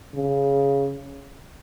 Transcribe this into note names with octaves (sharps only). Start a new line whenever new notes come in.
C#3